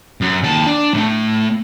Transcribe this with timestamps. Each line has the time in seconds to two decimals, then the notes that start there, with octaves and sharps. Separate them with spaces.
0.21 F#2
0.43 D#2 A5
0.67 D4
0.94 A2 A3